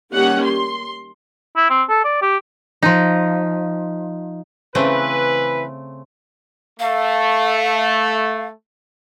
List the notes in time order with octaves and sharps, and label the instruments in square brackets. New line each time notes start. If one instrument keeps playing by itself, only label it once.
[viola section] D#3 G3 A#3 C#4 G4 F#5
C6
[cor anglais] E4
C4
A4
D5
G4
[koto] F3 D#4
[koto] C#3 A3 C4 [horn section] E3 B4
[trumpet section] A3 [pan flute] F5